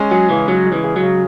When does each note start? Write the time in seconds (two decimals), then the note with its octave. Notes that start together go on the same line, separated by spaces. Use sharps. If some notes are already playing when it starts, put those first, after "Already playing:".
Already playing: G#3 C#4
0.11 F#3 G#4
0.30 C#3 E3
0.48 F#3 C#4
0.66 G#3
0.72 E3
0.84 G#4
0.96 F#3
1.02 C#3